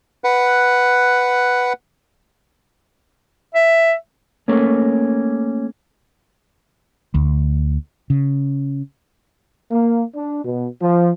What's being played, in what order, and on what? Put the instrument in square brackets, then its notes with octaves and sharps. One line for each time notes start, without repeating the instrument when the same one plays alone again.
[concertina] B4 F#5
[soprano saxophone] E5
[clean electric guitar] A3 A#3 C#4
[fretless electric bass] D2
C#3
[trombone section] A#3
D4
B2
F3